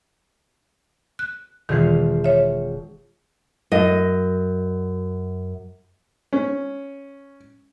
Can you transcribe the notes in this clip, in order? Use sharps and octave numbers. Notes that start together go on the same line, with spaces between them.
F#6
E1 D#3 E3 F4 C7
C#5 E5
F#2 D#5
C#4